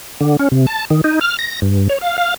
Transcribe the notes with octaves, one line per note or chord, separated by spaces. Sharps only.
D3
C#4
C3
A5
D#3
D#4
F6
A#6
G2
C#5
F5
F5